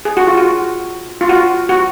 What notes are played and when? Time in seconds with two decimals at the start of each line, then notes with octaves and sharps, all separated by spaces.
0.05 G#4
0.17 F#4
0.27 F4
0.37 F#4
1.21 F4
1.29 F#4
1.69 F#4